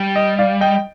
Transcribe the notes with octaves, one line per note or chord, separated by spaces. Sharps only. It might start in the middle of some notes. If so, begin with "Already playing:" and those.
Already playing: G3
D#5
D5 F5
D#5 G5